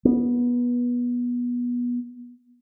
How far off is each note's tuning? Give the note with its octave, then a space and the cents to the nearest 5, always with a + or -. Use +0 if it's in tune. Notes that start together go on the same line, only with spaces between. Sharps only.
B3 -20